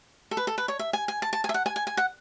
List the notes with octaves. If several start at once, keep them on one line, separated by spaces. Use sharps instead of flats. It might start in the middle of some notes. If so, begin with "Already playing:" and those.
A4
B4
A4
B4
C#5
E5
G#5
G#5
A5
A5
G#5
E5
F#5
G#5
G#5
G#5
F#5